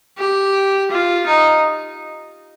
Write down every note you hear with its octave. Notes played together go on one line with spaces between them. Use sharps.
G4
F4
D#4